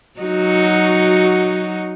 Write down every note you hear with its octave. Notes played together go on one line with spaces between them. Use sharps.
F#3 D#4 F#4